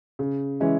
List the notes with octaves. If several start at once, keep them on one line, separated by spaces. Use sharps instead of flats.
C#3
E3 G#3 C#4 E4